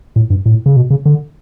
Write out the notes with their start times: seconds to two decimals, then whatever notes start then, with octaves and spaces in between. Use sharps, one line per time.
0.16 A2
0.30 G2
0.46 A2
0.66 C#3
0.76 B2
0.90 C#3
1.06 D3